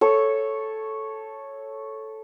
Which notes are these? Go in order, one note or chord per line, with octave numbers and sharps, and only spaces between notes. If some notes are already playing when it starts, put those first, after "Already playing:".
A4 C#5